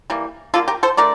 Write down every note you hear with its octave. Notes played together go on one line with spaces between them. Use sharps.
E3 G3 A#3
D3 G3 A#3 F4 A4
G4 A#4
A4 C5
D3 A3 A#4 D5